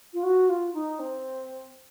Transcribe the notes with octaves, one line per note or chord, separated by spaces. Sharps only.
F4
F#4
F4
D#4
C4